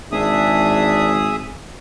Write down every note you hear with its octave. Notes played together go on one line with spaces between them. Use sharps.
G#1 D4 G#4 E5 D#6